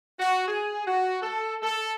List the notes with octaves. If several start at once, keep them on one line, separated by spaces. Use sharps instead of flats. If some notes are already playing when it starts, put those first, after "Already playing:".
F#4
G#4
F#4
A4
A4